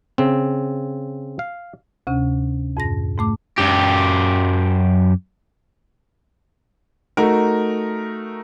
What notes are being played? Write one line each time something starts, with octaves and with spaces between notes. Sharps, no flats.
C#3 C4
F5
D2 C3 C#4
F2 G#2 A#6
G#2 A3 D6
F#2 G4
A3 D#4 F#4 A#4